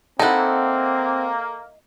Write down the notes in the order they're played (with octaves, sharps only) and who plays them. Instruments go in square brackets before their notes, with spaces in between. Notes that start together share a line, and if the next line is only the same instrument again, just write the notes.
[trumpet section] A#3 [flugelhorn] C4 [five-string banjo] D#4 E4 [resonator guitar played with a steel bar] A4 F#5